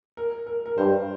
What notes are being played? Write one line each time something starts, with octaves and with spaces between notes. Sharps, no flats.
A#4
A#4
A#4
G2 C5